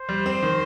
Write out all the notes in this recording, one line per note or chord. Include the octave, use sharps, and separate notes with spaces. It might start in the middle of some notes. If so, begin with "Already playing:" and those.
Already playing: C5
G3
C4
D#3